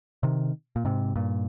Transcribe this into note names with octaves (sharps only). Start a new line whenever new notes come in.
C3 D#3
A#2
G#2 C3
G2 A#2